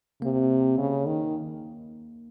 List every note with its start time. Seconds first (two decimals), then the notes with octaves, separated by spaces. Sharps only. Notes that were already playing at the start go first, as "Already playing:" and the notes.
0.22 C3 A#3
0.78 C#3
1.06 D#3